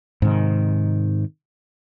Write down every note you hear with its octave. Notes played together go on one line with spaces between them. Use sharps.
G#2 C3 D#3